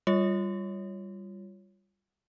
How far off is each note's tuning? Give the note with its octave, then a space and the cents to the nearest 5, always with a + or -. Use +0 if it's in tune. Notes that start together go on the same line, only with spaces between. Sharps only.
G3 +0 F4 +0 C#5 +0